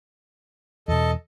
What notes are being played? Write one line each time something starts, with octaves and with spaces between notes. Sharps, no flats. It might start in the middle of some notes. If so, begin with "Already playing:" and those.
E2 B2 A4 D#5